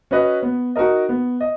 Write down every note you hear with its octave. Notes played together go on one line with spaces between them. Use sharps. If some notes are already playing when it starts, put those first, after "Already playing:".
C#4 F#4 B4 D#5
B3
D#4 F#4 A#4 D#5
B3
D#5